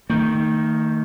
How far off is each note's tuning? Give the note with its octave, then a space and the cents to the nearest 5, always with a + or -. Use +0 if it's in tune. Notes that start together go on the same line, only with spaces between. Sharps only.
D#3 +0 A3 +35